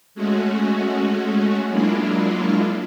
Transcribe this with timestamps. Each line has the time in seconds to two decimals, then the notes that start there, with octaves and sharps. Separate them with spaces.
0.15 G#3 A3 C#4 F#4
1.68 F#3 G#3 A#3 D4 E4 F4